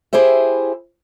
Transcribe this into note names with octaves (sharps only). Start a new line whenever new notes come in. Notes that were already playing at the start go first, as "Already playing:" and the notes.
E4 G4 G#4 C5 E5